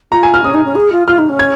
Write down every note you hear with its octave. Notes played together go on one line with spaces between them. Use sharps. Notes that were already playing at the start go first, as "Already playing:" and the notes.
F4 A#5
G#5
F6
C#4 D#6
D#4
C#4
G#4
F4
F4 F6
D#4
C#4
G#6